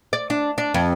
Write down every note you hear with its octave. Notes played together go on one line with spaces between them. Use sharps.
D5
D4
D4
F2